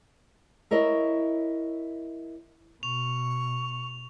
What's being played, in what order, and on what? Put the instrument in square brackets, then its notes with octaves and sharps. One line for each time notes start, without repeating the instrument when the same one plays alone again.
[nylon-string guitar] E4 A#4 C#5 D#5 E5
[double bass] B2 [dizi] C#6 [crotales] F7